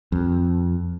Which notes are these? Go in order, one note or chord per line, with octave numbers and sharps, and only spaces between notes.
F2